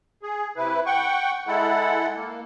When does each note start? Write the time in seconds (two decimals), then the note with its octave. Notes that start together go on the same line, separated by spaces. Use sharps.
0.23 G#4
0.57 C3 E4 B4
0.86 F#5 G5 C#6
1.47 G#3 E4 A4 F#5
2.15 A#3